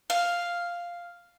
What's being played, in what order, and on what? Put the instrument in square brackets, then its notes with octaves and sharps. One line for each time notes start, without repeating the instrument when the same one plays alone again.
[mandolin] F5